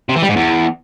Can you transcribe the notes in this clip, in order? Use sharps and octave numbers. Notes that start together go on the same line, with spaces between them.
C3
E3
G3
G#2
E2